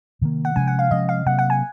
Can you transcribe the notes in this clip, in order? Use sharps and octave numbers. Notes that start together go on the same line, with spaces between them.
C3 D#3 A#3
F#5
C3 F3 G#3 C#4 G#5
F#5
F5
C3 F3 G#3 C#4 D#5
F5
C3 F#3 A#3 F#5
F#5
G#5